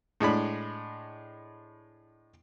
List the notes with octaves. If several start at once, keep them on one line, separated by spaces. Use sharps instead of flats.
A2 G#3 D4 B5